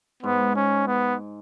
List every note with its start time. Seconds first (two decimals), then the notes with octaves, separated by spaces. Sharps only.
0.23 G#2 B3
0.56 C#4
0.87 B3